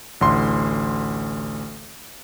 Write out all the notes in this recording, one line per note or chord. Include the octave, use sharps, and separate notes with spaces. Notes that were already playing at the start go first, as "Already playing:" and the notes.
A1 D2 C6